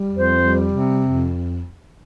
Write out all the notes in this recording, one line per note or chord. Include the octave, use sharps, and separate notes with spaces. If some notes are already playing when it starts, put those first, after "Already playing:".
Already playing: G3
F2
C5
G3
C3
F2